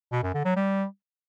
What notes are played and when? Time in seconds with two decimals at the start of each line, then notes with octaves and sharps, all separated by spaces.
0.12 B2
0.23 F#2
0.34 D3
0.45 F#3
0.56 G3